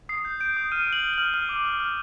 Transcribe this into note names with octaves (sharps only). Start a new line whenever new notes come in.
D#6 C7
G6
G6 D7
D#6
F6 D#7
F6
F#7
F6
F6 F#7
F6
D6
F6
F6